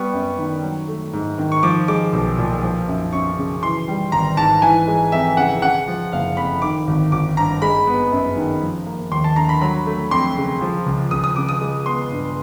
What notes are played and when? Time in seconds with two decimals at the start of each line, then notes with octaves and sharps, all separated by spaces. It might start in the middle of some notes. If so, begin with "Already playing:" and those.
Already playing: G3 B3 C#6
0.13 F#2
0.38 D#3
0.63 F#3
0.88 A3
1.13 G#2
1.38 D#3
1.52 C#6
1.63 F3 D6
1.88 G#3 D6
2.13 B1
2.38 A#2
2.63 F3
2.88 F#2
3.13 F#2 C#6
3.38 C#3
3.63 E3 C6
3.88 G3
4.12 G#1 A#5
4.37 G#2 A5
4.62 E3 G#5
4.88 G#3
5.12 F2 E5
5.37 C#3 F#5
5.62 C#3 F#5
5.87 F3
6.12 F#1 F5
6.37 F2 B5
6.62 D#3 D6
6.87 G#1
7.12 G#1 D6
7.37 G2 A#5
7.62 G#3 B5
7.87 B3
8.12 F#2
8.36 D#3
8.62 F3
8.87 A#3
9.11 D#2 C6
9.24 A5
9.36 D3 A#5
9.49 B5
9.61 F#3 B5
9.86 A3
10.11 F2 C6
10.36 C#3
10.61 F3
10.86 C#2
11.11 C#2 D#6
11.24 D#6
11.36 C#3 D6
11.49 D#6
11.61 G#3
11.86 B3 C6
12.11 G2